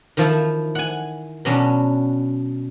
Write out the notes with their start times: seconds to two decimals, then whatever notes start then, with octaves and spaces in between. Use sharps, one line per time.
0.17 D#3 F3 E4
0.75 F#5 G#5
1.45 B2 F#3 C#4 D4